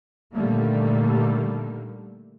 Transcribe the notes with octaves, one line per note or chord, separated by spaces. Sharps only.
A#2 D3 D#3 G3 A3 A#3